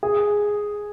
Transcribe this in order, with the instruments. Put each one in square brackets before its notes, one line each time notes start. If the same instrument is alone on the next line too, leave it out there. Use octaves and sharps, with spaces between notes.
[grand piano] G#4